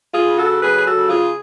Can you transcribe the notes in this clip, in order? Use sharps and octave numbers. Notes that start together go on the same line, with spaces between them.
F4 G#4
C#3
F#4 A4
F#3 G#4 B4
G#4
F#4 A4
C#3
F4 G#4